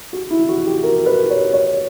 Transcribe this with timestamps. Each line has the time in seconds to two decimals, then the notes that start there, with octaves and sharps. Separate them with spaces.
0.13 F#4
0.30 E4
0.49 F#4
0.66 G4
0.83 A#4
1.06 B4
1.31 C#5
1.54 C#5